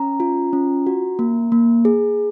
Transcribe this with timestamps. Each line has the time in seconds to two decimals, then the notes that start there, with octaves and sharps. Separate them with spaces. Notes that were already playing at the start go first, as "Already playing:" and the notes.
Already playing: C#4 A#5
0.20 F4
0.53 C#4
0.86 F#4
1.19 A#3
1.52 A#3
1.85 G#4